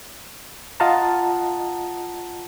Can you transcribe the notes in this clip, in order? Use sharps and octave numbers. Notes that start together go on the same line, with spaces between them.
F4 D#5 F5 F#5 A5 A#5